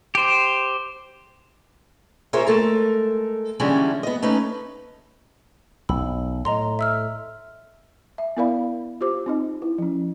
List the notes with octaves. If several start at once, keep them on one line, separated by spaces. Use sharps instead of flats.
G4 C5
F4 G#4 A#4 C5 C#5 E5
G#3 A3 A4 A#4
D3 E3 G3 G#3 C#4 D4
B3 D#5
A3 C#4 D#4 B4
B1 B5 E6
A2 D#5 A#5 C6
E5 E6 F6
E5
B3 E4 A#4 D5 F5 B5
F4 G4 C5 D6
C4 D#4 D#5
E4
F3 C#4